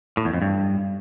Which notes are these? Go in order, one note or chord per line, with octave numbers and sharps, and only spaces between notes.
A2
E2
F2
G2